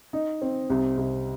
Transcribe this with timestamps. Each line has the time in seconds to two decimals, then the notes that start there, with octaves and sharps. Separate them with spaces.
0.13 D#4
0.42 C4
0.70 C2
0.97 C2